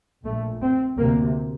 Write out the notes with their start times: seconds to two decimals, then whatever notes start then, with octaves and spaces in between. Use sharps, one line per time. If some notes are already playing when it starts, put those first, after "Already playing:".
0.24 A#1 A#2 A3
0.61 C4
0.97 D2 C3 A#3